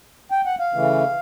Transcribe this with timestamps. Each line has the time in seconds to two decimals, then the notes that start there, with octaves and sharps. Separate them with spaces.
0.31 G5
0.45 F#5
0.59 F5
0.74 C#3 E3 A3